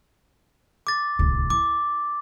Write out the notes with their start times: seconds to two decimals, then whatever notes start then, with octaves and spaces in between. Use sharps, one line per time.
0.87 D6 A6
1.19 D1 C2
1.50 E4 D6